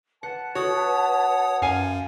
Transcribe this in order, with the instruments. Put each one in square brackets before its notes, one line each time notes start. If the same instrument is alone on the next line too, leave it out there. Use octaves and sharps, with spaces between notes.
[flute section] B4 A5 [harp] F#5
[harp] F#4 [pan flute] A4 [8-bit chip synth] C#5 D#6
[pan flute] F#5
[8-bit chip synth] F#2 [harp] F5 G#5